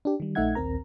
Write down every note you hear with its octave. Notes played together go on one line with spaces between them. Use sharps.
D4 G4
D#3 G3
A#1 A3 D#4 E5 F#5 G#6
A#1 D#2 C4 A#4 A#5